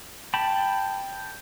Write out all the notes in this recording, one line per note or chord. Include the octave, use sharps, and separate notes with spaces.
G5 A5 B5